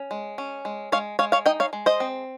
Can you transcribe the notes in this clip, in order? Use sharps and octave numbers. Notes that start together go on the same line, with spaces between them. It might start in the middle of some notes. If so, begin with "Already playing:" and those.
Already playing: C#4
G#3
C#4
G#3
G#3 C#5 F5
G#3 C#5 F5
C#5 F5
D#4 D#5 G5
C#5 F5
G#3
C5 D#5
C4